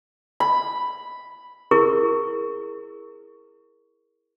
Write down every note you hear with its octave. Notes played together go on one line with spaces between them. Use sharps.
B5
E4 G#4 A#4 C#6